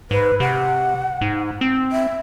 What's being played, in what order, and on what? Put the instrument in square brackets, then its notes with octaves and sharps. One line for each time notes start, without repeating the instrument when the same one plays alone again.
[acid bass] G#2 [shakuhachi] B4
[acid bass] C3 [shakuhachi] F#5
[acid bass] G#2
C4
[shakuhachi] E5